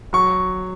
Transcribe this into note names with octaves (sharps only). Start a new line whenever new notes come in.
F#3 C#6